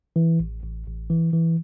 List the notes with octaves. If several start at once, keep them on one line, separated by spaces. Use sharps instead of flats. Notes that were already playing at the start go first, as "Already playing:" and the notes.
E3
A1
A1
A1
E3
E3